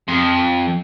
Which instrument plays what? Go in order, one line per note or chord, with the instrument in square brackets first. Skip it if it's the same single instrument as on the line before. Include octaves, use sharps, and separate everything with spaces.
[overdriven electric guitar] F2